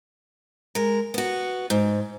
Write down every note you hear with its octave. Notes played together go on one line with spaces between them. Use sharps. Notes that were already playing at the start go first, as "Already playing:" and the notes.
G#3 A#4
B3 F#4
G#2